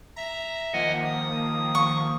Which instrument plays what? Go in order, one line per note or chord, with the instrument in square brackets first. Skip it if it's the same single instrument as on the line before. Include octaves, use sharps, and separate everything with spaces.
[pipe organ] E5 [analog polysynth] A#5
[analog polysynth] D#3 F3 A#3 [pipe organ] D#5 F#5 G#5
[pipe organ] D#6
[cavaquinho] C#6